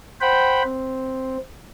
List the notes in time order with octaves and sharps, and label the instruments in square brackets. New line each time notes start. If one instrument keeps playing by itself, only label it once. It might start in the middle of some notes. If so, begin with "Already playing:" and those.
[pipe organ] C5 F#5 G5 B5
C4